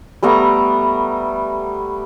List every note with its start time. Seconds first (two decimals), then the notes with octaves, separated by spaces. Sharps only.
0.23 G3 A3 B3 A#5